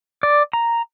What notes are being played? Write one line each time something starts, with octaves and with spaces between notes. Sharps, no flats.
D5
A#5